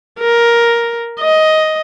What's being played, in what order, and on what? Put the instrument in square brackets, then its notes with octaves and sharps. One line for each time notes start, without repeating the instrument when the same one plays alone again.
[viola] A#4
D#5